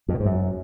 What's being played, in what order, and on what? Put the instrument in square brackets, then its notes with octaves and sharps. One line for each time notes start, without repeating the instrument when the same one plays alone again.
[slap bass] F2
B2
G#2
F#2